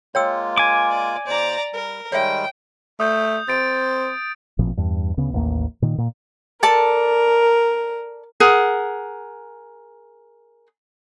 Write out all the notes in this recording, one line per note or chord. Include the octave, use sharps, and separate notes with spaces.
G#3 A#3 F4 C#5 G5 E6
G#5 D6
D5
D#2 C5 D5 A#5
G3 A#4
D#3 G3 G#3 C#5 E5 G5
A3 D#6 G6
C4 A6 D7
A1 A#2 F3 C4
E2 G2
D2 C#3 B3
A1 D#2 A#3
A#2 D#3
A#2
A4 A#4 D5 A5
G#4 A#4 F#5